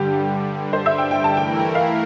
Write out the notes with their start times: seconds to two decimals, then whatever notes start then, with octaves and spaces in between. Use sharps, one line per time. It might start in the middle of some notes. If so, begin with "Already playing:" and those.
Already playing: G2 D3 G3 G4
0.73 C5
0.86 E5
0.98 G5
1.11 G5
1.24 A5
1.37 E3 A3 E4 A#4 G5
1.75 F5